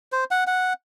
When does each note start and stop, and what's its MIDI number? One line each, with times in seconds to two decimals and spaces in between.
0.12 0.24 72
0.31 0.44 78
0.47 0.73 78